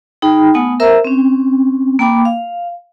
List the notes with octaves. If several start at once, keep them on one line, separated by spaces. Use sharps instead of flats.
D#4 G#4 G5 B5
A3 B3 F#5 G#5 D#6
A#4 C5 E5 A#5 E6
C4 C#4
A#3 G5 B5 D6
F5